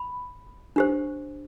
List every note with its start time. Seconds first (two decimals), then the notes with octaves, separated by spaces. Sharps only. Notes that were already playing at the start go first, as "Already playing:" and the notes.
Already playing: B5
0.76 D4 G4 C5